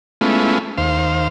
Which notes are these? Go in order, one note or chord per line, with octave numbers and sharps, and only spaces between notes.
G#3 A3 B3 C#4 E4 F4
D#2 C5 F5